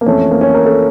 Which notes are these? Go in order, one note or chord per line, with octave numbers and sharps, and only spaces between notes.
A#3
F2 E3 A3 C#4
A#3
C#4
A#4
A4